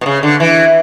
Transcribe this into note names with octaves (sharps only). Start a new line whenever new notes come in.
B2
C#3
D3
E3